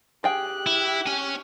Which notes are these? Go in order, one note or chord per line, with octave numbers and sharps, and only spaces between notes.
G4 G#4 G5 F#6
E4
C#4 G#5